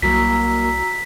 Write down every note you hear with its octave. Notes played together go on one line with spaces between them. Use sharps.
C2 F#3 A#3 F#4 A#5 E6 B6